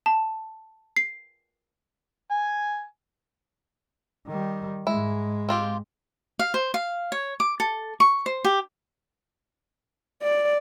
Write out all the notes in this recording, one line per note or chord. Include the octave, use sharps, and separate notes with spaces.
A5
C7
G#5
D#3 G3
G#2 G#3 E4
C4 F4 G4
F5
C5
F5
C#5
D6
A4
C#6
C5
G4
D5